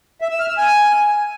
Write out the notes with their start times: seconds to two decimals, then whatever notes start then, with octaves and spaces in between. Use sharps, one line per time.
0.21 E5
0.30 E6
0.40 F6
0.49 E6
0.58 G#5